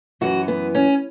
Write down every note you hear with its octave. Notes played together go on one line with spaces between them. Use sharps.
F#2 E3 F#4
B3
C#4